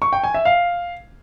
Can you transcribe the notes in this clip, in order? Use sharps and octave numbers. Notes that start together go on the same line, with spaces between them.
C#6
G5
G#5
E5
F5